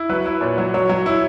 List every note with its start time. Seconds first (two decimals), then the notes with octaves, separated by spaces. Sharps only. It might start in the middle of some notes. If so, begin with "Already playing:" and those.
Already playing: E4
0.09 F#3 B4
0.26 E4
0.41 A#2 C#5
0.58 F#3
0.74 F#3 C#5
0.89 F#3
1.06 E4